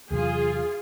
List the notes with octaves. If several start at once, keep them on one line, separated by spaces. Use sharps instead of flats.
E2 C3 F#3 F4 G#4